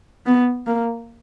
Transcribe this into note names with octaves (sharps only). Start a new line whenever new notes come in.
B3
A#3